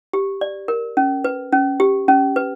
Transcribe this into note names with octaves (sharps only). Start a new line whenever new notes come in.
G4
D5
A#4
C#4
B4
C#4
G4
C#4
B4